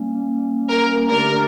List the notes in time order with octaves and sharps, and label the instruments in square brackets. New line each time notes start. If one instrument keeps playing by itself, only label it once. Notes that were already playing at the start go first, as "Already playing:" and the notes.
Already playing: [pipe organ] G3 A#3 C#4
[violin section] A#4
[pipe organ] D3 A3 D4 G4 D5 [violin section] A#4